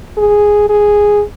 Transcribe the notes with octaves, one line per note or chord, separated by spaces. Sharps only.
G#4
G#4